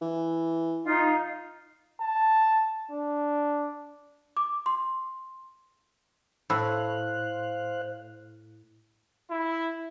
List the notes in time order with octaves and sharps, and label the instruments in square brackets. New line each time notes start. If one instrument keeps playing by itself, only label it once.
[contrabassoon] E3
[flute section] D#4 F4
[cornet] A5
D4
[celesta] D6
C6
[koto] A2 [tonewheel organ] C5 F5 F#6 [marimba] B5 E6
[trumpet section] E4